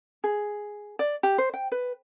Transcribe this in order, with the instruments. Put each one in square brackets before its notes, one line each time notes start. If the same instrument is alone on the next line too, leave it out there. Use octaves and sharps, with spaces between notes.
[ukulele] G#4
D5
G4
C5
G5
B4